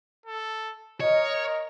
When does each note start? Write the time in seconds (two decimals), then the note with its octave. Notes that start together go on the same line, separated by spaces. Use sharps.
0.26 A4
1.00 A#4 C#5 D#5